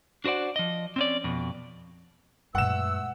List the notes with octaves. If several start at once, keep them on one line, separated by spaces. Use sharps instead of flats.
D4 F#4 C5 D5 F#5
F3 D#5
C4 C#4 D5
F2 B2
F#2 A#2 E3 G#3 A3 F#5 E6 E7